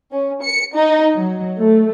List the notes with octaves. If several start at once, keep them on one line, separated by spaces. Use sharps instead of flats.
C#4
C#7
D#4
F#3
A3